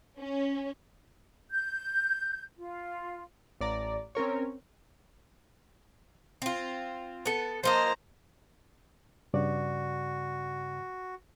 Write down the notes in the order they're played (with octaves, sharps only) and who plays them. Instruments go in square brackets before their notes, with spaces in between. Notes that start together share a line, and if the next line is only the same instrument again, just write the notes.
[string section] C#4
[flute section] G6
F4
[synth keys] A1 D5 A#5
C4 C#4 A#4 C#5
[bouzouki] C4 F4
B3 A4
[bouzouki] F3 A#3 D#5 [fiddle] C5 A#5
[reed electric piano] G2 C#3 D5 [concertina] F#4